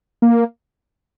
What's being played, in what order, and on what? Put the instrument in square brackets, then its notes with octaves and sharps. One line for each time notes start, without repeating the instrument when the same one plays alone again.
[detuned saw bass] A#3